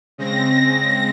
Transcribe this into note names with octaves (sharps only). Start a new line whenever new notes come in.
C#3 G#3 C4 A#6